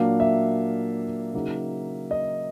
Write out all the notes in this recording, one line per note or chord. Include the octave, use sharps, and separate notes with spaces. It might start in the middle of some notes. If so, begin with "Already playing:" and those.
Already playing: A#2 F#3 A#3 D4 F5
E5
C#3 F#3 A#3 D#4
D#5